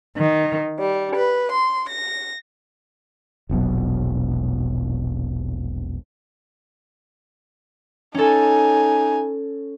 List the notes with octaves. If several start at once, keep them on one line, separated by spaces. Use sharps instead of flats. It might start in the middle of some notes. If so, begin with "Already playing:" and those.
D#3
G3
B4
C6
A#6
E1 A#1 B2 F#3
C#4 D#4 A4 G#5